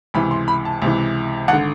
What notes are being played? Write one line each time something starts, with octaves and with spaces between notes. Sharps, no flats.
C#2 C3 E3 B5
C6
B5
A5
C#2 C3 E3
G#1 D3 F#5